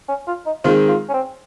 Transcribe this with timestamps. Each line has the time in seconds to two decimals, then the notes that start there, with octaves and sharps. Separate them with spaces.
0.08 C#4
0.27 F4
0.46 D#4
0.64 D#3 G#3 C4 F4
0.89 F4
1.09 C#4
1.14 C4